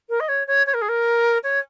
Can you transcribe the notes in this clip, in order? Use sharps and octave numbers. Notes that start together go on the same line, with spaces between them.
A#4
D#5
C#5
C#5
C#5
A#4
G#4
A#4
C#5